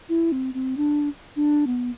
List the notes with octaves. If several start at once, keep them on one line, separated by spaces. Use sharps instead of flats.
E4
C4
C4
D4
D4
B3